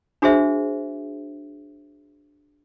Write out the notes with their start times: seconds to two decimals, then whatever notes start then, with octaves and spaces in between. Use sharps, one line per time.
0.22 D4 F#4 G#4 C5 E5